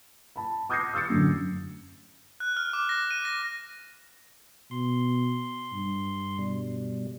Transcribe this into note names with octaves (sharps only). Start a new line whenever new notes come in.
A5 B5
D6 D#6 G6 G#6 A#6 C7
D#6 E6 G6 A6 C#7
F#2 A2 D3 D4
F#6
F6
D6
A#6
D#7
A#6
B2 C6
G2
B2 G3